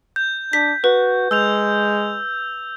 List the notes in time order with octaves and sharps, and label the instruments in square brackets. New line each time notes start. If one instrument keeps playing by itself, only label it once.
[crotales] G6
[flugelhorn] D4 [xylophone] B6
[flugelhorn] F#4 [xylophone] B4
[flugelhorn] G#3 [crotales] E6 G6 F7